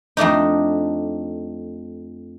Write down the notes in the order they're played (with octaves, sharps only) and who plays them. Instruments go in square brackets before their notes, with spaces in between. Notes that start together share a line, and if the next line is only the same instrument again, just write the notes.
[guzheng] F2 A3 D4 D#4